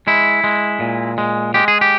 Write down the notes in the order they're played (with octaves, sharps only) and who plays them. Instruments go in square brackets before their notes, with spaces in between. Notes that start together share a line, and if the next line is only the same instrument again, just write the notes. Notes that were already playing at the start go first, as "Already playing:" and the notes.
[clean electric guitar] G#3 E4
G#3
A#2
G#3
G#3 G4
G#4
G4